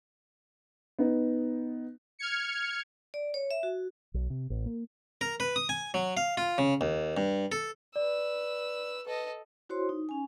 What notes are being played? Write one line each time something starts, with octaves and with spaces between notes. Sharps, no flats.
B3 D#4
F6 G#6 C#7
D5
C#5
E5
F#4
B1
C3
A1
A#3
A#4
B4
D#6
G#5
F#3
F5
F4
C#3
D#2
G2
A4
B4 D5 E6
A4 B4 D#5
E4 F#4 C5 C#5 C6
D#4
C#4 G#5